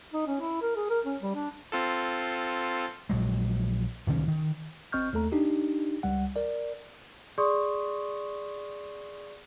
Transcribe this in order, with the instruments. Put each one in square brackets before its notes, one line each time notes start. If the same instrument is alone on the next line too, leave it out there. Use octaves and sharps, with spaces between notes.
[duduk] D#4
C#4
E4
A#4
G#4
A#4
C#4
G3
D4
[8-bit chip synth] C4 F4 A4
[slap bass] A#1 F#3 G#3
D1 C2 D#3 C#4
D#3
[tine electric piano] G#1 C4 D#5 C#6 F6 G6
D#2 A3 A4 A#5
D4 D#4 G4
C#2 G3 F#5
A#4 D5
[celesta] G#4 D5 C6 C#6 D#6